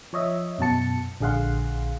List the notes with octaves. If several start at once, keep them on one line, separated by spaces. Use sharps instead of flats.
F3 C#5 D#5 E5
F#2 B2 F#4 A5 C#7
A#1 D3 G#4 F5 F#5 C6